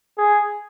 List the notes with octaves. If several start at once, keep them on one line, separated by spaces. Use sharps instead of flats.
G#4